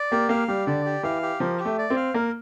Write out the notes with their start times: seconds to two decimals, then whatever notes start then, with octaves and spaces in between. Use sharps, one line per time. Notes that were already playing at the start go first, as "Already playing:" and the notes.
Already playing: D5
0.12 A#3 G4
0.29 A#3 F5
0.48 G3 G4
0.67 D3 D5
0.85 G4
1.03 E3 F5
1.22 G4
1.40 F3 A#4
1.59 G4
1.65 A3
1.78 D5
1.90 C4
1.96 F5
2.14 A#3 A#4